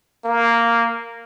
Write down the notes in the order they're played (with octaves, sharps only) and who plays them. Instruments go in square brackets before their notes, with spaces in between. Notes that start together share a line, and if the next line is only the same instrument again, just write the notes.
[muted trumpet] A#3